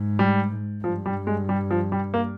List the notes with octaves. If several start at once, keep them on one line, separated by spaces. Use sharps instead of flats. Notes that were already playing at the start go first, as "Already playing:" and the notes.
Already playing: G#2
G3
G2 F3
G3
G#3
G3
F3
G3
A#3